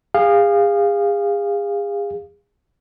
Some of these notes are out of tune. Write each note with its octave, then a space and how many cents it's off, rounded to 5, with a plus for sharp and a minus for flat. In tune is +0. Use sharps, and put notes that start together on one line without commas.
G#4 -35 F5 +0